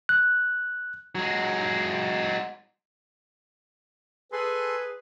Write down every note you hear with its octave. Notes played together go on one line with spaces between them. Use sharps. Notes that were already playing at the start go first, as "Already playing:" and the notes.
F#6
F#3 G#3
G#4 A4 B4 C6